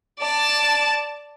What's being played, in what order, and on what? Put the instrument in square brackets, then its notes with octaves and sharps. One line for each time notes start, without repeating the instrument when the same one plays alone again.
[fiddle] D5 A5